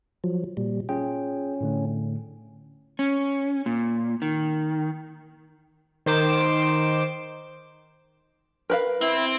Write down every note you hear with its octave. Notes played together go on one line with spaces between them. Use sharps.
F3 F#3
A#2 G3
C#4 F4 G#4 G5
A2 D3 A3
C#4
A#2
D#3
D#3 C5 D6 E7
A#4 B4 F5
C4 E4